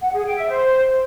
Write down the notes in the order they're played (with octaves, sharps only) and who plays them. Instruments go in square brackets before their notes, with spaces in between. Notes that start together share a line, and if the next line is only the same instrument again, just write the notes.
[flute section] F#5
G#4
G5
E5
C5